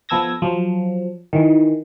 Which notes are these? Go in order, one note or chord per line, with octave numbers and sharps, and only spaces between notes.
F3 B3 A4 E6 G#6 A#6
F3 F#3
D#3 E3